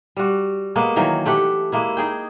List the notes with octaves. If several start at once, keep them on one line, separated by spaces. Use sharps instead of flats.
G3 F#4
G#3 A#3 B3
D#3 E3 F#3 A#3
A3 G4 F#5
G#3 A#3 E4
D#4 G#4 G5